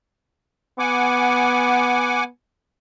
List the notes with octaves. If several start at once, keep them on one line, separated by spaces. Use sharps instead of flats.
B3 F#5 G#5 D6